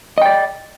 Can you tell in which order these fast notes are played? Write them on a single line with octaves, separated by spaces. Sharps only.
D#5 G5 D5